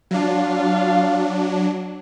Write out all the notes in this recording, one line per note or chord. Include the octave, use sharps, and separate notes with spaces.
F#3 D4 F4 F5